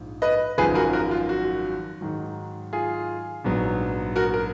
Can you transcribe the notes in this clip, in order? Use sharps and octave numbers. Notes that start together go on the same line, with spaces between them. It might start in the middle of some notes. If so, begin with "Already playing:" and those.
Already playing: A#1 G#2 F3
B4 D#5
G#1 F#2 F3 G#4 B4
F#4 A#4
F#4 A#4
F4
F#4
G#2 D#3 F#3
F4 G#4
A#1 G#2 F#3 B3
F#4 A#4
A#4